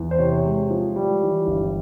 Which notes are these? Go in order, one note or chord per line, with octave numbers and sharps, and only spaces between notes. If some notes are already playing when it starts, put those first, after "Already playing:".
Already playing: E2
C5
C3 C#5
G#3
F3
G3
E3
G1